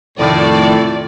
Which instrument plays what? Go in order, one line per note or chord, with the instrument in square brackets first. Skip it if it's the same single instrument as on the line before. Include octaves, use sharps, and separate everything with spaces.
[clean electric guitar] F2 C3 D#3 [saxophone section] A2 [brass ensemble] A3 F4 A4 [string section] D5